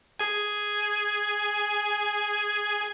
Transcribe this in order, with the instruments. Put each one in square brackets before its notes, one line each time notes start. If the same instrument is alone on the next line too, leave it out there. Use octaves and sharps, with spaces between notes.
[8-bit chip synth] G#4 G#5